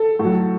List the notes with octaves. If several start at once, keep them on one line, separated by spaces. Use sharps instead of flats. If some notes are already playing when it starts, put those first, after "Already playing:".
Already playing: A4
A2
F#3